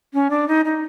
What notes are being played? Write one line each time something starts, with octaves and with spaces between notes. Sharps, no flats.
C#4
D4
D#4
D#4